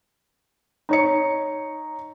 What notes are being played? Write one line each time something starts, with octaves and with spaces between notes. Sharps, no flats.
D#4 C#5 C#7